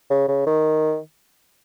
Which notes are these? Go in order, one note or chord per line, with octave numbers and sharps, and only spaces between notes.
C#3
C#3
D#3